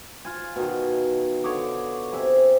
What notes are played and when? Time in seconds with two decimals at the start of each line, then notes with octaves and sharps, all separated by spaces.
0.25 F4 G#5
0.56 B2 D#3
1.44 D3 C#5 D#5 D6
2.12 C3 C4 E5 G#5